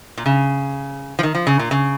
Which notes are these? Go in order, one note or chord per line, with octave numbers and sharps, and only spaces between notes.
A#2
C#3
F3
D#3
F3
C#3
A#2
C#3